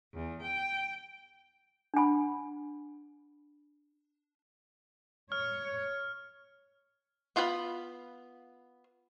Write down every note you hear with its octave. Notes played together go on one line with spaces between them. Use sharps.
E2
G5
D4 F#5 G#5 B5
C#5 F6
B3 F4 F5 G5 B5